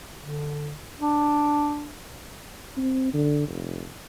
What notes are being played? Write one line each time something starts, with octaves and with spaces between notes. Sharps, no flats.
D3
D4
C4
D3
F1